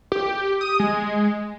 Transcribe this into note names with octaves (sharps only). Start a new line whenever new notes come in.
G4
D#6
G#3